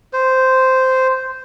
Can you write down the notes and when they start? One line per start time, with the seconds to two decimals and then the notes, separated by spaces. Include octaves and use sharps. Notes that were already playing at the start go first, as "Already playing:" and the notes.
0.13 C5